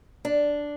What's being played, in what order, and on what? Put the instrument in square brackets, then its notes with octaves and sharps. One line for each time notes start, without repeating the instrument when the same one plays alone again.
[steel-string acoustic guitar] D4